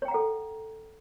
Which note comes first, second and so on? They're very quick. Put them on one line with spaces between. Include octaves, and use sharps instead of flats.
C#5 G5 A#5 F#5 A4